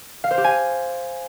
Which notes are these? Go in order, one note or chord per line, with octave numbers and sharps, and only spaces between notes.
F5
C5
G4
G#5